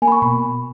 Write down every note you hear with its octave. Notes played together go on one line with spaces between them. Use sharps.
A#3 G#5
B5
C#6
B2 B5